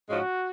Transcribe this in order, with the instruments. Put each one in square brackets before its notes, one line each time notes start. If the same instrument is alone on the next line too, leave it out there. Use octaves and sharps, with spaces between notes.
[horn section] G#2 F3 G#3 C#4 F#4